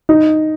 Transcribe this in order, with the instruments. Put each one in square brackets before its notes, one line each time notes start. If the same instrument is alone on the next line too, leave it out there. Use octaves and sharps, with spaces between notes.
[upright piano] D#4